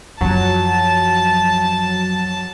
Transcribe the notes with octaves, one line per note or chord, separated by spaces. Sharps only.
F#2 F3 F#3 A5